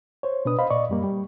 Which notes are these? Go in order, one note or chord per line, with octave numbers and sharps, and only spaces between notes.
C5 C#5
B2 D4 B4 D#6
C5 D#5 F5 B5
A#2 D5 D#5 C#6
F#2 G3 A#3
G3